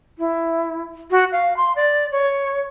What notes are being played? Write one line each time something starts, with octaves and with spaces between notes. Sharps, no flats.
E4
F#4
F5
C6
D5
C#5